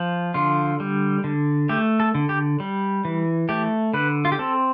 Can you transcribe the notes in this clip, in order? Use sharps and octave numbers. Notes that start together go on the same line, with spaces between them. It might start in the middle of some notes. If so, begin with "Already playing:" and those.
Already playing: F3
D3 F4
G3
D3
A3 G4
A4
D3
G4
G3
E3
A3 G4
D3 B4
F4
G4
C4 A4